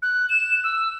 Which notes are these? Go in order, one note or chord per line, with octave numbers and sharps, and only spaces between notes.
F#6
E7
E6